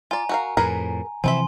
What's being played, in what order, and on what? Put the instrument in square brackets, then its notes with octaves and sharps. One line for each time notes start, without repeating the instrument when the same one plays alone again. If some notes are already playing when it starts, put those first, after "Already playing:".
[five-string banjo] F4 D5 [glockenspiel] G#5 A#5
[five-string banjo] F#4 A#4 F5
[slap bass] F2 A2 [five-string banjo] G#4 A#4 B4
[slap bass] C3 E3 F3 [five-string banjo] C4 E4 E5 [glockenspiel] G#5 C6